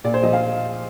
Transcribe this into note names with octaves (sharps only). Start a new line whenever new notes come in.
A#2 D5
C5
F3 D#5
F5